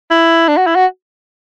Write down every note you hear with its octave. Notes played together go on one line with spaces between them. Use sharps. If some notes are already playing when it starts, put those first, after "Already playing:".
E4
D4
F#4
E4
F#4